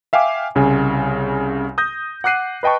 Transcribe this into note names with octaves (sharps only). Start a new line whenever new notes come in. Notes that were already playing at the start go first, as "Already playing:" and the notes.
E5 F5 G5 G#5 D6
C2 C#3 G#5
D#6 G6 A#6
F#5 D6 F#6 C7 D#7
B4 D#5 G5 A5 C#6